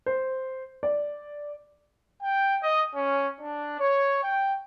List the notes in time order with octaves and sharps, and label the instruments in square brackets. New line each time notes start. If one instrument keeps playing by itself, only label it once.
[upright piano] C5
D5
[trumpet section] G5
D#5
C#4
D4
C#5
G5